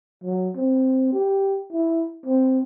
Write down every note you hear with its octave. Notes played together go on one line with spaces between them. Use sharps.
F#3
C4
G4
E4
C4